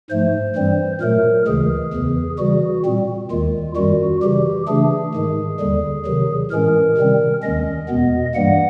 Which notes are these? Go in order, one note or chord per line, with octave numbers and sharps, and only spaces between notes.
G#2 F3 A3 C5
G2 E3 G3 C4
A#2 F#3 A3 A#4
D2 C#3 E3 G#3 G#4
E2 C#3 E3
C#3 E3 G3 F#4
A#2 G3 C4
D#2 D#3 G#3 F4
F#2 D#3 G3 F#4
C#3 E3 G3 G4
C#3 E3 A3 D4 G#4
G#2 D#3 G#3
D#2 D3 G3
C3 D#3 F#3
A2 E3 G#3 C#4 A#4
C3 D#3 G3 C4
D#2 D#3 G#3 C#4 D#5
E2 B2 G#3 B3
G2 E3 G3 A#3 F#5